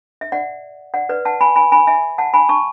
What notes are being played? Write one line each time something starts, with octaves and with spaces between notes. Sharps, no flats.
E5
D5 F#5
D5 F#5
B4 D5
F#5 A5
G#5 B5
G#5 B5
G#5 B5
E5 G#5
F#5 A5
G#5 B5
A5 C#6